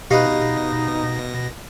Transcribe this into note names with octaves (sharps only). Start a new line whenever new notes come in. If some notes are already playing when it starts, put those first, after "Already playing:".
B2 D#4 G4 B4 D#5 F5 A#6